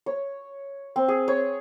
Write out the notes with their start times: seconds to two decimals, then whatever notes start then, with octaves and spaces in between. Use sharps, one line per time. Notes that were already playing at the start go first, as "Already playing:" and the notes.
0.06 C#5
0.96 C4
1.08 G#4
1.28 C#5